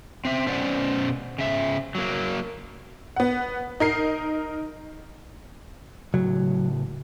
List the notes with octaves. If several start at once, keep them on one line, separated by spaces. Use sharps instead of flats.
C4 E5
B2 C#4 C5 D5 F#5
C#3 E5
F#3 A#3
B3 F#5
D#4 A#4 C7
A2 C#3 F#3